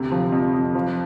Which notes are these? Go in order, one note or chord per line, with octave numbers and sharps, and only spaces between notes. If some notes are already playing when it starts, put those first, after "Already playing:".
Already playing: D2 C3
F3
F2
F2
F3